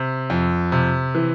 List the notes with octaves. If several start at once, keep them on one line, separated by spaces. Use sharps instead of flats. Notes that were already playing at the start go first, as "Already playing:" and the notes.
Already playing: C3
F2
C3
E3